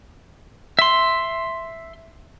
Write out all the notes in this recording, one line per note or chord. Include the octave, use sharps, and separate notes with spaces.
E5 C6